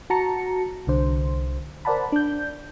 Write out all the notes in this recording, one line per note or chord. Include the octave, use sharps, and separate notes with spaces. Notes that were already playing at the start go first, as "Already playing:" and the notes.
F#4 A5 A#5 C#7
C2 D3 C5
A#4 C5 D5 F#5 A5 B5
D4 G6